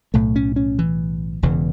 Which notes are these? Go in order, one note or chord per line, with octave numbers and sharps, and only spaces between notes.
B1 A2 A3
C#4
C#4
E3
E1 E2 C#3 E3